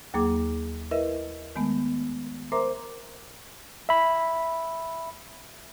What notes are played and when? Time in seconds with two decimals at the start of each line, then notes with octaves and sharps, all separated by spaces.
0.14 D#2 F#3 A#3 G#4 D6
0.91 E4 A#4 B4 D#5 E5
1.56 D#3 G#3 A3 B3
2.52 A#4 C5 E5 A#5 C6 D6
3.89 E5 B5